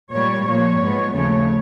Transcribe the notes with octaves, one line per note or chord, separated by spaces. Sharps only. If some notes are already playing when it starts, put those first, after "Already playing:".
A#2 G3 A#3 C#5
A#2 F3 A#3 C#5
G#2 F3 G#3 B3
D#2 C#3 F3 A3 C#5